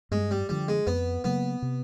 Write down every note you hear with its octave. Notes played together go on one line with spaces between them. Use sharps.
G2 G#3
G3
D3 F3 G3
G#3
F2 B3
C#3 F#3 A#3 B3
C3